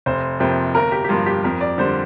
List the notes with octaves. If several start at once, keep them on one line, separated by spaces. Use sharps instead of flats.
F1 C5
F2 C3 A#3 C5
G1 A#4
G4
G4
G2 F3 A#3 F4
G4
F2 A#4
D5
D3 G3 A#3 C5